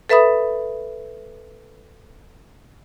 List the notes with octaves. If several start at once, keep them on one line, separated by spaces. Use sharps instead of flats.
A4 B4 E5 B5 D#6